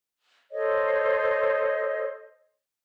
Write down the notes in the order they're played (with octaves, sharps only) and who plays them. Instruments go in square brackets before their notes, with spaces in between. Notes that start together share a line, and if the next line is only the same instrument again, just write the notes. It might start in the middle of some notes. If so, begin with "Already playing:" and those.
[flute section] A4 C5 C#5 D#5